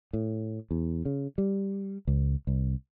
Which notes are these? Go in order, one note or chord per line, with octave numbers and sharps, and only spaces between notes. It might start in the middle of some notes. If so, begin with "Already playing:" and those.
A2
E2
C#3
G3
C#2
C2